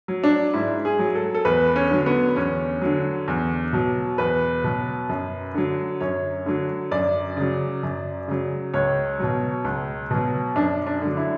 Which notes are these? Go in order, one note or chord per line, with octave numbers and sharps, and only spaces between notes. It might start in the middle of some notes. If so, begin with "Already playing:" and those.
F#3
D4
G#2 E4
G#4
F#3
A4
A4
E2 B4
C#4
D3 F#3
B3
E2 C#4
D3 F#3
E2
B2 F#3
E2 B4
B2 F#3
F#2
D3 F#3
F#2 C#5
D3 F#3
F#2 D5
C#3 F#3
F#2
C#3 F#3
C#2 C#5
B2 F#3
C#2
B2 F#3
F#2 D4
D4
D3 F#3
E4